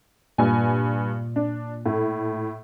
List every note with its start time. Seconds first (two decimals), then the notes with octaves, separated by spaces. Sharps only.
0.38 G2 A#2 G#5
1.36 D4
1.86 A2 A3